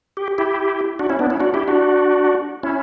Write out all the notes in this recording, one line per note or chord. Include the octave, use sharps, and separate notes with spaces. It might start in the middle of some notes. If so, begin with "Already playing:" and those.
G4
E4 G4
D4 F#4
C#4 E4
B3 D4
C#4 E4
D4 F#4
E4 G4
D4 F#4
C#4 E4